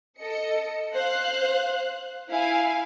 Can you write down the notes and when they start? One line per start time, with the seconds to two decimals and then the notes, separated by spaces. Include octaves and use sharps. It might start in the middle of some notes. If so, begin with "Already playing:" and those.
0.18 A4 D#5 C#7
0.94 C5 F5 F#6
2.30 E4 F5 G#5